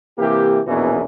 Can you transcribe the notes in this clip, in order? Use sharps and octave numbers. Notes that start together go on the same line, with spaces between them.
C3 E3 A#3 G4
A#1 E2 B2 E3 C#4 A#4